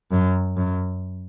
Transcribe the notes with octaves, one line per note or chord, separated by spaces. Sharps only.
F#2
F#2